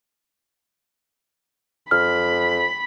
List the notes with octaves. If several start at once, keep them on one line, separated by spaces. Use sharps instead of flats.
F2 B5 F6